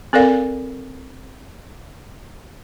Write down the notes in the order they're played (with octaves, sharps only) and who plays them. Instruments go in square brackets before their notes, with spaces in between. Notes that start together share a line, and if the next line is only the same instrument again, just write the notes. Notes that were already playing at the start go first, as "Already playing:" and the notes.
[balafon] C4 A4 A#4 D5 F5